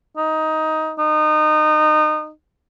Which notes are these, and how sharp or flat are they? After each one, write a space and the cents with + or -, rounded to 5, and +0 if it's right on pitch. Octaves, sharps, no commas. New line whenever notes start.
D#4 +15
D#4 -25